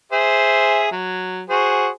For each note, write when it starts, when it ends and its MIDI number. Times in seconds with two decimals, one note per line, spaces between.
0.12 0.89 68
0.12 0.89 72
0.12 0.89 76
0.91 1.42 54
1.50 1.89 66
1.50 1.89 68
1.50 1.89 72